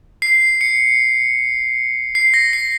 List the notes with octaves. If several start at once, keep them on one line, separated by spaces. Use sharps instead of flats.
C7
C#7
C7
A#6
C7